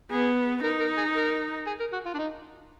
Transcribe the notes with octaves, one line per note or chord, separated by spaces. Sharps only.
B3 G#4
D#4 A#4
A#4
G#4
A#4
G#4
A#4
F#4
F4
D4
D#4